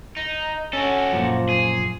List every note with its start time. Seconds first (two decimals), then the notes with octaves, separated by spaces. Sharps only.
0.17 D#4
0.73 C#4 F#4 A4
1.13 F#2 A#2 F3
1.49 G#4